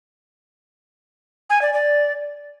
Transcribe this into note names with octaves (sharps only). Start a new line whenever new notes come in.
G#5
D5
D5